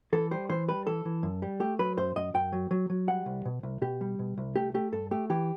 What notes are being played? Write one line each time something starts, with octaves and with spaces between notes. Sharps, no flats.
E3 A4
G3 C5
E3 C5
G3 B4
E3 A4
E3
F#2
G3
A3 G4
F#3 B4
F#2 C5
F#2 D#5
F#2 G5
F#3
F#3
F#3
G3 F#5
C2
B2
C2
B2 G4
G3
B2
C2
A3 G4
A3 G4
G2 A4
A3 G4
E3 G4